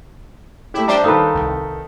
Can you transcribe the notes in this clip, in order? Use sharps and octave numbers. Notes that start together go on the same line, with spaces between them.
A3 E4 G4
G3 D4 C5 E5 A#5 D6
D#3 D#4 A4 B4 F5
C2